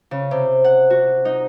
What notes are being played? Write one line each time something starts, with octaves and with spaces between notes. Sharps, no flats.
C#3
C3
F#5
F#4
D#4